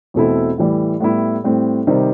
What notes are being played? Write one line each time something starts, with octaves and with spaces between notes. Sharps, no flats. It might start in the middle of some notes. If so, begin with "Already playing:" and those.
E2 B2 A3 C4 E4
A2 E3 G3
A2 G3 B3 E4
A2 G3 C4
C3 D#3 G3